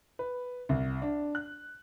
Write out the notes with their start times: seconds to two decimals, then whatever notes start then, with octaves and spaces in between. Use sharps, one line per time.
0.19 B4
0.69 C2
1.02 D4
1.35 F#6